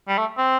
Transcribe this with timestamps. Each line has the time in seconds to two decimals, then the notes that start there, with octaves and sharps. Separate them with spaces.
0.08 G3
0.18 A3
0.38 C4